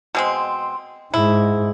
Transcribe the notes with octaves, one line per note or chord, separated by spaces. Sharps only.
B2 G#3 C4
G#2 E4